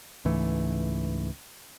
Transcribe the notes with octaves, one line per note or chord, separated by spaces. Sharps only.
C#2 G#2 E3 A3